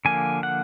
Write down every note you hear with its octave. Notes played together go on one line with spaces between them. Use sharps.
D3 F3 A#3 G#5
F#5